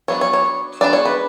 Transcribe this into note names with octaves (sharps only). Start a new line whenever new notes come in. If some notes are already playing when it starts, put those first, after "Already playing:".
F#3 B3 D4 C#5
C#5
C#5
G#3 B3 D4 D5
C#5
B4